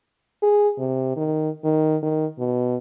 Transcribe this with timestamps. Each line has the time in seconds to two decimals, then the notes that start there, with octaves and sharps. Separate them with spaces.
0.43 G#4
0.79 C3
1.17 D#3
1.64 D#3
2.03 D#3
2.39 B2